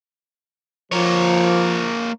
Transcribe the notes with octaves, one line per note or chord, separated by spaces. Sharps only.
F3 A#3 C#5